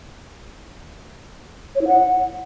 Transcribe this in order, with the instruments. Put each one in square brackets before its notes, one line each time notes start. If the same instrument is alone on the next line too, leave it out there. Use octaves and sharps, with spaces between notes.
[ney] C#5
E4
F#5